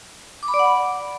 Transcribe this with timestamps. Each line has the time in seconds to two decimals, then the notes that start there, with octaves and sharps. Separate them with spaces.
0.43 D6
0.48 B5
0.54 D5
0.59 F#5